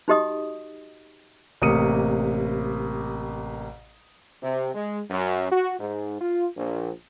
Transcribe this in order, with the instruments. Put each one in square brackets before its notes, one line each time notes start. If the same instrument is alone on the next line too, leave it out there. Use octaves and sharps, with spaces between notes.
[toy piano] D#4 F#4 G4 D#5 D#6
[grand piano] A1 C3 A#3 D#6 C#7 D#7
[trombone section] C3
G#3
F#2
F#4
G#2
F4
A#1